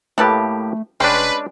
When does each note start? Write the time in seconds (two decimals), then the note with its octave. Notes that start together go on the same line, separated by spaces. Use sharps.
0.18 A2 A3 A#3 G4 A4 B4 A5
1.00 F1 G#3 C#4 D4 B4 G5 C6